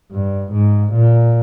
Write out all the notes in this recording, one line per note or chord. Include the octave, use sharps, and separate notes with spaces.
G2
G#2
A#2